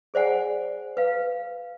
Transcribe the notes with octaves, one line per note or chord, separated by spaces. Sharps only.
G#4 C5 D5 F#5 G#5
B4 F5